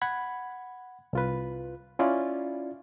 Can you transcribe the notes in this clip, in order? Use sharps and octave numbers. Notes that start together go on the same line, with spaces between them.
F#5 B5 G#6
C2 F4 B4
C#4 E4 F4 D5